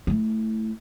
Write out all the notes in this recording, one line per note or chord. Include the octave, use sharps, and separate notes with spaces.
A3 E4